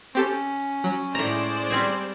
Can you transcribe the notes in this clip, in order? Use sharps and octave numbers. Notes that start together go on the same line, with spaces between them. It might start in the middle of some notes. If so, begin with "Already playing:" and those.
C4 C#4 G4 A4
F#3
A2 G#3 C5 D5 A#5
G3 C4 G#4